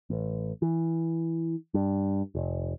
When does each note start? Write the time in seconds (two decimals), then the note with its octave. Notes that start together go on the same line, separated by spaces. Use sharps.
0.10 A1
0.62 E3
1.74 G2
2.35 F1